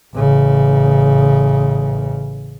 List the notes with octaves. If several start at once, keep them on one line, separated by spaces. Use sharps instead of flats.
A1 C#3